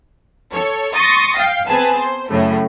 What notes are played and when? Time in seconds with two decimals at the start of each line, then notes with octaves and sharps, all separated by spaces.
0.52 A4 C#5
0.93 C6 C#6 D#6 A6 A#6
1.37 F5 G5
1.66 B3 C4 G#4 B4 G#5 A5
1.96 C5
2.29 F#2 A2 C#3 A3